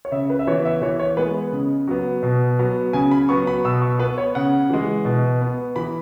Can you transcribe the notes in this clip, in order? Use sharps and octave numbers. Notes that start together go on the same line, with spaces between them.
C#5
C#3 E5
B4
E5
E3 B3 C#5
E5
E3 C#5
C#5
G#3 B3 B4
C#3
F#3 B3
B2
F#3 B3
C#3 G#5
B5
F#3 B3 C#6
B5
B2 E6
C#6
B3 B4
C#5
C#3 F#5
E3 G#3
B2
B3
E3 B5